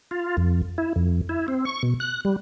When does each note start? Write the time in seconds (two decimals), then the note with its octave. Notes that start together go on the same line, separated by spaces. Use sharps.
0.11 F4
0.37 F2
0.78 E4
0.96 F2
1.29 E4
1.48 C4
1.65 C#6
1.83 B2
2.00 F#6
2.25 G3